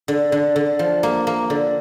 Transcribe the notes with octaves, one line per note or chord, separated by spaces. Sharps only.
D3
D3
D3
F3
A#3
A#3
D3